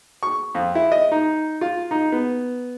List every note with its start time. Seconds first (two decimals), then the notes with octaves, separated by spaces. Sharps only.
0.23 C#6
0.55 F2
0.75 E4
0.92 D#5
1.12 D#4
1.61 F4
1.91 D#4
2.12 B3